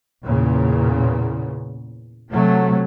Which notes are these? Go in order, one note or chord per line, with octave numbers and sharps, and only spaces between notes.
E2 A#2 C#3
C3 F#3 A3